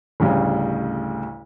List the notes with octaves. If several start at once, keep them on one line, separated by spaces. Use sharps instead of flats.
A1 D2 C#3 G3 C#5